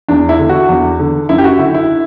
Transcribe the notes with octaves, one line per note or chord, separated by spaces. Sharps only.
E2 D4
E4
D3
F#4
E2
D3
F#2 E4
G4
F#4
D3 E4
E4